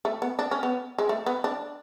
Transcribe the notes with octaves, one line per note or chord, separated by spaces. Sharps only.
A3
B3
D4
C#4
B3
G#3
A3
B3
D4